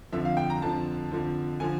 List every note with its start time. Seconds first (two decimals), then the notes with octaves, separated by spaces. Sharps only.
0.12 F2 D3 F3 E5
0.25 F5
0.37 G5
0.50 A#5
0.62 F2 D3 F3 A5
1.12 F2 D3 F3
1.60 D3 F3 G#5